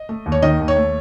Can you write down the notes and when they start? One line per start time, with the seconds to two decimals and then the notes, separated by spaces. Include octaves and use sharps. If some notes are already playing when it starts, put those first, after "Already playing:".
Already playing: D#5
0.09 A3
0.26 D#2
0.32 C#5
0.42 D#3 D#5
0.60 D#2
0.68 C#5
0.77 A3